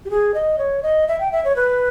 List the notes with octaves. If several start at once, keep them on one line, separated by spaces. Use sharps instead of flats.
G4
G#4
D#5
C#5
D#5
E5
G5
E5
C#5
B4